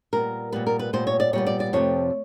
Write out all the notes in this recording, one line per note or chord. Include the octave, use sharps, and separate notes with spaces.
A#2 G3 B3 A#4
A#2 G3 B3 B4
A#4
B4
A#2 G3 B3 C5
C#5
D5
A#2 G3 B3 C#5
D5
D5
F2 C3 F3 A3 C#5